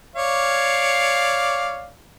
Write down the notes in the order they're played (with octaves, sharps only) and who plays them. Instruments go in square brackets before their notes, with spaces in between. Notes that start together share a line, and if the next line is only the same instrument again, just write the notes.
[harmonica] C#5 D5 F5